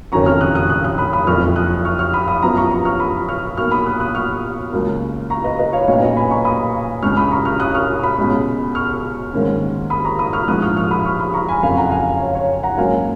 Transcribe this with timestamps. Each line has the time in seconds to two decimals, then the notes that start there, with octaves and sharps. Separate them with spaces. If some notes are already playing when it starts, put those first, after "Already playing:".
0.12 F#1 F2 D#3 F#3 C#4 A#5 C#6
0.26 C#6 F6
0.41 D#6 F#6
0.55 D#6 F#6
0.70 D#6 F#6
0.84 D#6 F#6
0.98 B5 D#6
1.13 B5 D#6
1.27 F#1 F2 F3 C#6 F6
1.56 D#6 F#6
1.85 C#6 F6
1.99 C#6 F6
2.13 B5 D#6
2.28 B5 D#6
2.42 F#2 F3 B3 A#5 C#6
2.57 A#5 C#6
2.71 A#5 C#6
2.85 C#6 F6
3.00 B5 D#6
3.29 C#6 F6
3.57 B1 B2 A#3 C#6 F6
3.71 B5 D#6
3.86 D#6 F#6
4.00 D#6 F#6
4.15 C#6 F6
4.72 C#2 C#3 F#3 A#3
5.30 A#5 C#6
5.44 B4 D#5
5.59 B4 D#5
5.73 C#5 F5
5.87 B1 A#2 F#3 C#4 C#5 F5
6.02 B4 D#5
6.16 G#5 B5
6.31 A#5 C#6
6.45 B5 D#6
7.02 C#2 C#3 G#3 C#6 F6
7.17 B5 D#6
7.31 A#5 C#6
7.45 C#6 F6
7.60 D#6 F#6
7.75 C#6 F6
8.03 B5 D#6
8.18 C#2 B2 G#3 C#4
8.75 C#6 F6
9.33 G#2 D#3 A#3 C#4
9.90 B5 D#6
10.04 A#5 C#6
10.19 B5 D#6
10.33 C#6 F6
10.48 A#1 G#2 F3 G#3 D#6 F#6
10.62 C#6 F6
10.76 C#6 F6
10.91 B5 D#6
11.05 C#6 F6
11.20 B5 D#6
11.33 A#5 C#6
11.48 G#5 B5
11.63 F#1 F2 C#3 F5 G#5
11.77 F#5 A#5
11.91 F5 G#5
12.20 C#5 F5
12.35 C#5
12.63 F#5 A#5
12.78 G#2 F#3 A#3 C#4 F5 G#5